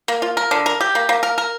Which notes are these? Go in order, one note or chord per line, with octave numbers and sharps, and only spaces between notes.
A#3
F4
A#4
D3
A#4
G4
A#3
A#3
A#4
A#4